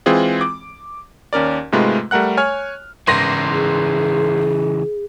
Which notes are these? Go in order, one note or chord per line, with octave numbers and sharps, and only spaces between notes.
E3 G#3 C4 F4 G#4
D6
D#2 C#4 A#4 D5
G#2 C3 G#3 A3 F4 B4
G3 A3 A#4 F#5 F#6
C#5 G#5 F6
G#1 C#3 E3 C6 A#6
G#4